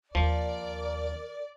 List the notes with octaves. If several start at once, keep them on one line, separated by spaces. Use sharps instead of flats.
D#2 F3 A#4 D5